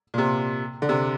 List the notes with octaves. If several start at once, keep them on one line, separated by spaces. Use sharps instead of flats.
A#2
C3
D3
C3